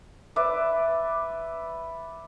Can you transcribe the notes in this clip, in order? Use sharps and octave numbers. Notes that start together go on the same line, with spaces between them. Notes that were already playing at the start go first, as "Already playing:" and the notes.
B4 D5 E5